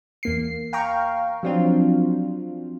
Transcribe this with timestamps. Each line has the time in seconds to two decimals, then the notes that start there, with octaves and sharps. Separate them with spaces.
0.23 E2 A#3 C7
0.73 F5 G5 A#5 C#6
1.43 F3 F#3 C4 D4 F4